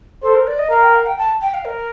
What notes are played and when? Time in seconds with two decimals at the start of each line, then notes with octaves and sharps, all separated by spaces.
0.22 A4 C5
0.34 A#4
0.47 D5
0.58 D#5
0.70 A#4 F5
0.82 G5
0.94 F5
1.06 G5
1.18 A5
1.41 G5
1.53 F5
1.64 A#4